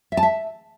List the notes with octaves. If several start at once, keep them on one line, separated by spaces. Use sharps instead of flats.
E5
A5
E5